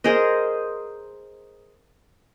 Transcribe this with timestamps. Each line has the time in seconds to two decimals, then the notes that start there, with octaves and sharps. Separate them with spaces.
0.04 G#4 A#4 C5 D#5